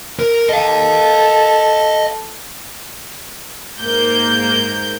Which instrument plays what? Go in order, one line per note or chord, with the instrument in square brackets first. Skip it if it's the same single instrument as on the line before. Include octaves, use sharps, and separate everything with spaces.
[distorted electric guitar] A#4
[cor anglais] A4 [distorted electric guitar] D#5 F5
[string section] G#2 A#3 G6